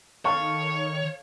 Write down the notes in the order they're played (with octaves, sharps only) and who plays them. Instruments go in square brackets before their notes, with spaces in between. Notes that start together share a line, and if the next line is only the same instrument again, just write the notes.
[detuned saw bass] D#3 [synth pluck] A4 F5 A5 [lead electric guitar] C#5 [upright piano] C#6